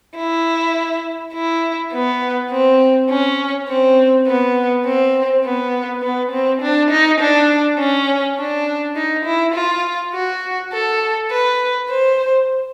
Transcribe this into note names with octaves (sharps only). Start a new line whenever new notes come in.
E4
E4
B3
C4
C#4
C4
B3
C4
B3
B3
C4
D4
D#4
D4
C#4
D4
D#4
E4
F4
F#4
A4
B4
C5